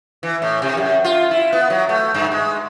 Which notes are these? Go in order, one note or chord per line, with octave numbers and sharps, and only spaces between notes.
E3
A2
C3
F#2
F4
E4
B3
F#3
A3
G2
G#3